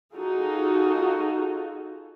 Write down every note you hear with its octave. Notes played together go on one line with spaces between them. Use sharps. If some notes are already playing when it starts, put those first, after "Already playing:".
D#4 F4 F#4 G#4 A4